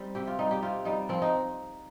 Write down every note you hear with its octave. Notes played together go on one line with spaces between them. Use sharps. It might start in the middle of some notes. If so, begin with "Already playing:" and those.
Already playing: G3 C4 D#4
C3 G4
F4
G3 D#4
G4
C3 F4
G3 D#4
F3 C4
D#4